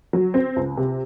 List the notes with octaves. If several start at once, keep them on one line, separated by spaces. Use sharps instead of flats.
F#3
C4
C#2
C3